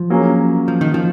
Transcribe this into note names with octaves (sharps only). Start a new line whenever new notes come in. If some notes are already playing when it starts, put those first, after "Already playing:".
Already playing: F3
F#3 A#3 C#4 G#4
F3
D#3
F3